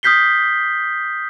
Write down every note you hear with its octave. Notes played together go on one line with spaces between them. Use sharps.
D#6 F6 G6 B6 C7 G7